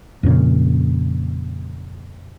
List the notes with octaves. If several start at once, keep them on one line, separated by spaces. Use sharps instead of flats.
F2 A#2 C#3